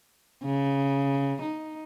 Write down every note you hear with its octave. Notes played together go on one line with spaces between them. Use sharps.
C#3
D#4